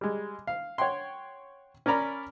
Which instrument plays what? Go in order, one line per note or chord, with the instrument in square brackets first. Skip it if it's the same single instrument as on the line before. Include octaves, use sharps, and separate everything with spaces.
[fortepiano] G3 G#3
F5
C#5 F#5 G5 C6
C#4 A#4 D5 A#5 B5